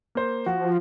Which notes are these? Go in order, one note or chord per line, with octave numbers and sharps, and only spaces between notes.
A#3 C5
F3 F#4